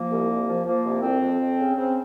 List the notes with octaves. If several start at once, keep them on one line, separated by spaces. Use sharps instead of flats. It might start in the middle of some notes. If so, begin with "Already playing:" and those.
Already playing: F3 A#3
C2
C2
F3
F3 A#3
C2
F2 C4
F2
F2
C#3
C#3 C4